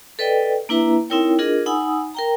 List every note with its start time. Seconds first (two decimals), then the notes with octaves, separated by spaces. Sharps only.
0.19 A4 B4 D5 D#5 G5
0.69 A#3 D4 E4 B4 E5 A#5
1.10 C4 D#4 E4 A#4 C#5 G5
1.39 D4 F4 G#4 A#4 D#5
1.66 D#4 F#5 G#5 B5 D#6 E6
2.15 A#4 G5 A#5